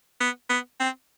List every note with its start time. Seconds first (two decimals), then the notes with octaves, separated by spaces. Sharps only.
0.20 B3
0.50 B3
0.80 C4